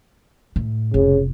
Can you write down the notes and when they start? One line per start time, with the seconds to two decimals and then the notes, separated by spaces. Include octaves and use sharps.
0.56 A2
0.94 F1 C#3